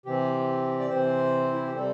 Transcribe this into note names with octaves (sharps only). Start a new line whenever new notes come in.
C3 E3 C4 G4
D5
C3 E3 C4 C5
E4
G4
C3 G3 C4 A4